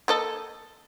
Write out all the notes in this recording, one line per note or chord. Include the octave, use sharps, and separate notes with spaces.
A#3 A4 D#5